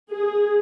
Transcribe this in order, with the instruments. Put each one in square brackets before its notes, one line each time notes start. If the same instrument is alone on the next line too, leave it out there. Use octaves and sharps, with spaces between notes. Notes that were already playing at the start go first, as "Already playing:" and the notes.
[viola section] G#4